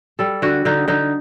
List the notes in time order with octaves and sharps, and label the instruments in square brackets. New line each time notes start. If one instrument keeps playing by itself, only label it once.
[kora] G3 A4
D3 F#4
D3 D#4
D3 D#4